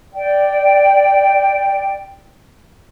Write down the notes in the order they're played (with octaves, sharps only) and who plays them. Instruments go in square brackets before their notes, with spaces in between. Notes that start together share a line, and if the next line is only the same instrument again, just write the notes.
[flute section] D5 G5